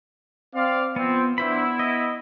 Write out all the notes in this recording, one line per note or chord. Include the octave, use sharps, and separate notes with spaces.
C4 D5 F5
F3 B3 C4
B3 D4 E4 C5 B5
D#5